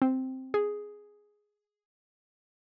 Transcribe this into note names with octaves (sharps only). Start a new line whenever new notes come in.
C4
G#4